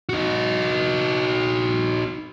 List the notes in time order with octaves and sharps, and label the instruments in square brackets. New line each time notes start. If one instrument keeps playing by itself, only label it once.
[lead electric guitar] D#4 F#4